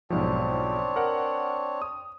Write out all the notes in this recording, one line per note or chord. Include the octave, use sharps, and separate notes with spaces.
B1 G#2 F3 C4 D4 C#5
A#4 F#5
D#6